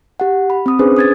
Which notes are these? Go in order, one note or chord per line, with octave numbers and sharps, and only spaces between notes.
G4 F#5
B5
C4 D#6
C#4 D4 G#4 B4 C5
D#6 G#6 A6